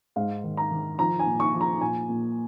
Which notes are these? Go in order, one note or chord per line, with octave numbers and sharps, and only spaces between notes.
G#2 F5
D#3
A#5
D#3
F3 A#5
G#5
A#2
C#6
F3
A#5
A#2 G#5
A#2